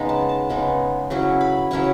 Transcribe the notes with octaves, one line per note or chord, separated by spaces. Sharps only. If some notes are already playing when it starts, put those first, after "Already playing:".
Already playing: C#3 G#3 B3 D#4 B5
A5
A5
C#3 G#3 B3 D#4 C#6
C#3 F#3 C#4 E4 C#6
B5
C#3 F#3 C#4 E4 C#6